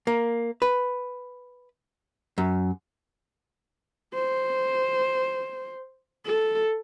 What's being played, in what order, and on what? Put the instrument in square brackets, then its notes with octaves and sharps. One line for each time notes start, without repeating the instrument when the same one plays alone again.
[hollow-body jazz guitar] A#3
B4
F#2
[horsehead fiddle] C5
A4